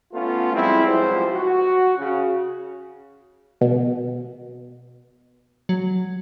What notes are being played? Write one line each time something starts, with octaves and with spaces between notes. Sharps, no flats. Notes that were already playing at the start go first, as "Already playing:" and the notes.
A3 B3 C#4 F4
F3 G3 G#3 C4 E4
C#2 F3 F#3 G#3 G4 C5
F#4
C#3
B2
F#3